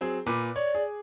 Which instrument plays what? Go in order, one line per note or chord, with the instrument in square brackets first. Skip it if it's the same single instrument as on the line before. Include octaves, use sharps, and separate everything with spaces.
[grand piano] F#3 C4 G#4
A#2 B4 D6
[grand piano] C#5 [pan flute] D5
[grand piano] G#4